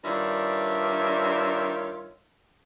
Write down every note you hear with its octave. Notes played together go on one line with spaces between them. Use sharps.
G2 D#3 D4 F4 C#5 E5